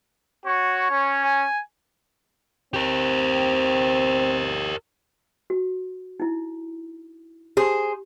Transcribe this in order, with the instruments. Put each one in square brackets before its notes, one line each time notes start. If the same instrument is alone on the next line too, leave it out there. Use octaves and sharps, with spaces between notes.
[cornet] F#4 [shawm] C#5
[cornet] C#4
[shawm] G#5
[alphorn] C4 [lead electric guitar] G4 A#4
[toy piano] F#4
D#4 E4
[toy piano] G4 [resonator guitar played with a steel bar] G#4 C5